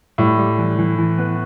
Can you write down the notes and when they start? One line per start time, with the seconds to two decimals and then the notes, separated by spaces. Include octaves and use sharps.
0.18 A2 G3
0.39 G3
0.59 E3
0.79 E3
0.98 E3
1.19 B3